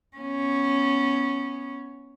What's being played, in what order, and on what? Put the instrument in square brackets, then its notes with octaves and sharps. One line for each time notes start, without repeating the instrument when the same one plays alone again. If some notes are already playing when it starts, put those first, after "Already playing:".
[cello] B3 C#4